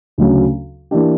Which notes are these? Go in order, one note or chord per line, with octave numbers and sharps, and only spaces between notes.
D2 C#3 F#3
E3 A#3 D4 G4